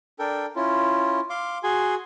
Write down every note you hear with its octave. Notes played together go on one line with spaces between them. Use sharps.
D4 A4 A#4 G5
C#4 E4 F4
F5 C6 D6
F#4 G#4 G#5 C6